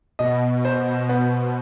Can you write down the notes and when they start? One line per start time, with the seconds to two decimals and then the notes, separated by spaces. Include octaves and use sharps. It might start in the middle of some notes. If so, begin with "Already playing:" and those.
0.19 B2 D#5
0.65 C5
1.09 B3